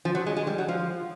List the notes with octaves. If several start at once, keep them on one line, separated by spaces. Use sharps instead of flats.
F3
F#3
G#3
G#3
G3
F#3
F3